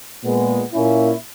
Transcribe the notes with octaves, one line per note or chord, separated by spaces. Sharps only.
A#2 G#3 B3
A#2 A#3 C#4 E4